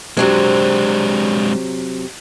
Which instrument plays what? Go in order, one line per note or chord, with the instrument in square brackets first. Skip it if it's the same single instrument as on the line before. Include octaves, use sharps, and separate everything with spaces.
[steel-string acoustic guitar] C3 F#3 C4 [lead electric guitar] G#3 D4